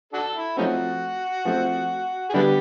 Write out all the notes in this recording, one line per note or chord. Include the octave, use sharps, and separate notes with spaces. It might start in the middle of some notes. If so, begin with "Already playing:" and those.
D4 F#4 A4
E4
F3 A3 C4 C#4 D#4 F#4
F3 A3 C4
G#4
D3 G3 B3 D4 E4 G4